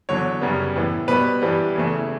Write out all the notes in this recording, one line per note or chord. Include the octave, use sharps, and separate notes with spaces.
E2 D3 F#3 C#5
F#2 C#3 G3 B3
A2 E3 B3
B2 G3 B3 B4
G2 E3 G3 B3
E2 C#3 E3 A3